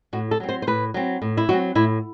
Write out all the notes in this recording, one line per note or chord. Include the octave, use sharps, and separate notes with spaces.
A2 F#4
A4
F#3 C4
C5
C5
A2 B4
F#3 C4
A2
E4
F#3 C4 F#4
A2 E4